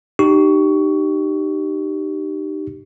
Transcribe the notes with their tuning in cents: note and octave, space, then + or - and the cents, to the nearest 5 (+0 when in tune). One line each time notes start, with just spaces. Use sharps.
D#4 -25 G4 -15 C#6 +15